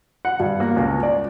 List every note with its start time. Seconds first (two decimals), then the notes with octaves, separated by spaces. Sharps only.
0.25 F#5
0.40 G2
0.60 A#3
0.76 C#2
1.03 D5